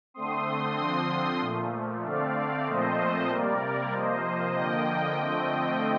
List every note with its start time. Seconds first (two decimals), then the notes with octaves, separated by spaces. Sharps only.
0.14 D3 A3 C4 C6 D#6
0.77 D3 F3 C4 C6 D#6
1.40 A#2 F3 A3
2.03 D3 A3 C4 D5 F5
2.66 A#2 F3 A3 C4 C5 D#5
3.29 C3 G3 A#3 A#4 D5
3.92 C3 F3 A#3 C5 D#5
4.55 D3 F3 A#3 D#5 G5
5.18 D3 F3 A3 C4 D#5 G5